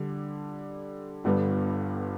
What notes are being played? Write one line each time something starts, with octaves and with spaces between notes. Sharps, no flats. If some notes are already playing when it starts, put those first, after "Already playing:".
Already playing: D3 G3 D4
G1 G2 D3 G3 B3